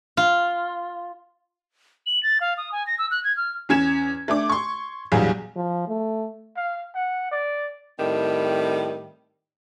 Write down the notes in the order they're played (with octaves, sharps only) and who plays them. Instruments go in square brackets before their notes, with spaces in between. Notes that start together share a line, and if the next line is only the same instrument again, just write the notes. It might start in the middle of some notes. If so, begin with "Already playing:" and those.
[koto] F4
[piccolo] F#7
A6
F5
D#6
G#5
A#6
E6
F#6
G#6
F6
[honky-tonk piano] E2 C#4 G#6 E7
A3 D4 D6
C6 C#6
A#1 E2 F#3 G3 G#4 F5
[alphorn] F3
A3
[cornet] F5
F#5
D5
[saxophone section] A2 D#3 G3 C4